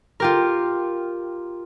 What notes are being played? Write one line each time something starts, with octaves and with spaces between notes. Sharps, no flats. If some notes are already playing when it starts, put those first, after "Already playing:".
F4 G4 A#4